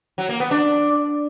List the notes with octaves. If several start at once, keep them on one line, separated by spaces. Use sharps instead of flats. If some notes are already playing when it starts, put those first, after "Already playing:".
F#3
A#3
B3
D4